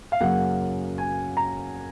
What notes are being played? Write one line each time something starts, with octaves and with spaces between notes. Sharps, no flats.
F5
F#2 C#3 F#3 A#3 F#5
G#5
A#5